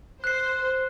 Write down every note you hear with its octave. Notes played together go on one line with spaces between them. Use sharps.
C5 F#6 C7